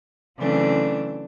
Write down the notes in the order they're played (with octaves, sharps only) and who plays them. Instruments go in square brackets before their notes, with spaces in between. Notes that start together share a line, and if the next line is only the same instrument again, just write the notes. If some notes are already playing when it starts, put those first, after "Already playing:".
[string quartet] C#3 E3 F#3 A3 C4 D4